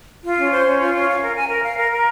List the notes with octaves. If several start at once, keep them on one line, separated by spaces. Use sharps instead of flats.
F4
C#4
C5
C#4
F4
C#4
F5
A#4
G#5
A#4
F5
A#4
A#4